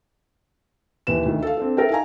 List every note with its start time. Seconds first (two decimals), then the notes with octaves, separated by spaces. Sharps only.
1.07 D#2 E3 B4 E7
1.25 D2 D#3
1.43 A4 F5
1.57 C4 D4 A4
1.77 A4 A#4 E5 G5
1.90 D#4 F5 G#5 A#5